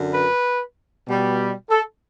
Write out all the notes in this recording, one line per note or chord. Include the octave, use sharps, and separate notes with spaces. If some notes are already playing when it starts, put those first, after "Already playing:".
Already playing: F#2 D3
B4
B2 G3
A4